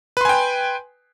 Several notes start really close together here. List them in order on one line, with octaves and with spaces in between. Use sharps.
B4 C6 G#5 G5